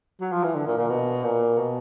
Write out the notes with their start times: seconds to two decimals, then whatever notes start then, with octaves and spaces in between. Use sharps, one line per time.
0.21 F#3
0.32 F3
0.44 E3
0.55 D3
0.67 A#2
0.78 A#2
0.89 B2
1.24 A#2
1.58 B2